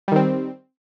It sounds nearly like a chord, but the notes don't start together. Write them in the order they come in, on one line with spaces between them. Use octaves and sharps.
G3 D#3 C4